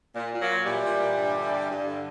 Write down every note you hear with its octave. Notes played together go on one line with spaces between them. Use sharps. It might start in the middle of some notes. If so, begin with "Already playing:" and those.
A#2
A#2
F#3 A#3
A#2
A#2 E3 G3
A#2
A#2
G2
D3
G2
G2
D3